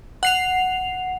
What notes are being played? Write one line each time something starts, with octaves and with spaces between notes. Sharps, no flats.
F#5 C7 F7